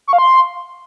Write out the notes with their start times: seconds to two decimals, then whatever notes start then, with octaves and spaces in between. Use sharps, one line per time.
0.08 C#6
0.13 F5
0.18 C6